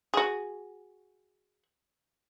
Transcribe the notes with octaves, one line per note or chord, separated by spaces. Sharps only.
F#4 G#4